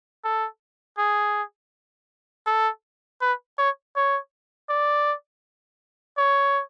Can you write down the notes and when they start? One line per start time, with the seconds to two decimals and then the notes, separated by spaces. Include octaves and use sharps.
0.24 A4
0.98 G#4
2.47 A4
3.22 B4
3.59 C#5
3.96 C#5
4.70 D5
6.18 C#5